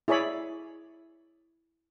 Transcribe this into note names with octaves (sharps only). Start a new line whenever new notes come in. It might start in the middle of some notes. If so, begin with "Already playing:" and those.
E4 G#4 C#5 D5 B5